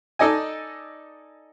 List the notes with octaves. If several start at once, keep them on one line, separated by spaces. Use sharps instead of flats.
D#4 A4 D5 D#5 G#5